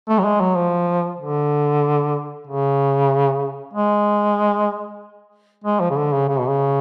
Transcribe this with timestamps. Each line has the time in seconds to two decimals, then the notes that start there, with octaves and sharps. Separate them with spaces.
0.09 A3
0.19 F#3
0.25 G#3
0.41 F#3
0.56 F3
1.19 D3
2.47 C#3
3.74 G#3
5.64 G#3
5.81 F3
5.90 C#3
5.97 D3
6.13 C#3
6.28 C#3
6.39 B2
6.49 C#3